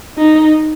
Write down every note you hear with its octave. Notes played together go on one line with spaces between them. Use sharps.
D#4